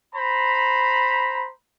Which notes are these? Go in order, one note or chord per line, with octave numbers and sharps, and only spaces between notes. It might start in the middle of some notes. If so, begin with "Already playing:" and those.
C5 A#5 B5